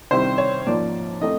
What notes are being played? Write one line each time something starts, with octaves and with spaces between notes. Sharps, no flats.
C3 D#3 G3 C4 E4 C5
C#5
G#2 F3 A#3 D5
E3 A3 C4 D#5